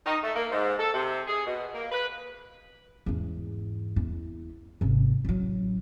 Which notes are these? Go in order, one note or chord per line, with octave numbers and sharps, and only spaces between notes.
D#4
A3
A#3
G#2
A4
C3
G#4
B2
A#3
B4
E2 G#2
E2 E4
G#1 C3
A1 F#3